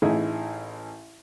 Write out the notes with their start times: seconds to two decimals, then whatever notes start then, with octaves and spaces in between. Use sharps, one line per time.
0.02 A1 D#4 E4 G#4